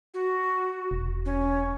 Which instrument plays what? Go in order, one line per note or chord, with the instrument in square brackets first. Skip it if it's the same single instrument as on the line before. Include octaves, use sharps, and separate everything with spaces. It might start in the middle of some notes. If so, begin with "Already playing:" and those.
[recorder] F#4
[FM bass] E1
[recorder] C#4